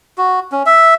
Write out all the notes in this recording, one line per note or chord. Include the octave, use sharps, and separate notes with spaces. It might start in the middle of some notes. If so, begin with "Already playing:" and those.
F#4
C#4
E5